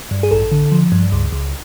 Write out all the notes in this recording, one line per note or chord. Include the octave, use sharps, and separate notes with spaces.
G2
G#4
A1 A4
D3
F3
G2
C#2
C#2